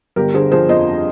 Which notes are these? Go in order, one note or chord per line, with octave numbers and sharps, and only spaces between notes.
G1 G4 A#4
D3 G#4 C5
F3 G#4 C5
F2 C5 D#5